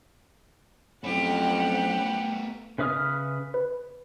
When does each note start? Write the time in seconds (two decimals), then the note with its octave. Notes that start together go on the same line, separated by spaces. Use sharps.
1.04 F2 F#3 A3 B3 C#4 E4 G4 F#5
2.78 C#3 B4 E5 D#6 F6
3.54 B4